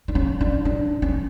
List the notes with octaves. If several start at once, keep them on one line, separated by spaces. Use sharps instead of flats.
D4
C#4
D4
D4
C#4